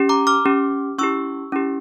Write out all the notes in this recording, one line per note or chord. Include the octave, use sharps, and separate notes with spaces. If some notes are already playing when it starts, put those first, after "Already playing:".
Already playing: C#4 G4
A#5 D6
D6 F6
C#4 G4
C#4 E4 G4 C#6 E6
C#4 E4 G4